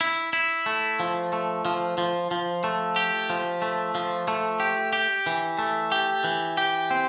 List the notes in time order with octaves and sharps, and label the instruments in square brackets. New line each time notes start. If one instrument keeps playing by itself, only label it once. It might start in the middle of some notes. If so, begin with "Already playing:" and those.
[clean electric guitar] E4
E4
A3
F3
A3
F3
F3
F3
A3
G4
F3
A3
F3
A3
G4
G4
E3
A3
G4
E3
G4
C4